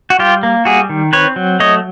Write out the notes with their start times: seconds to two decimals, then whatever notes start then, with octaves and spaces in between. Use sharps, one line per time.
0.10 F#4
0.19 G3 F4 G4
0.43 A#3
0.65 G3 F#4 G#4
0.89 D#3
1.13 C4 B4 C#5
1.36 F#3
1.60 A3 C#5 D#5